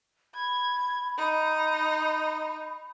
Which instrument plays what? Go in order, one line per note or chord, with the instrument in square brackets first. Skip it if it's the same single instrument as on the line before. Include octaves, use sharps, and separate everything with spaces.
[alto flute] B5 [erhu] G#6
[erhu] D#4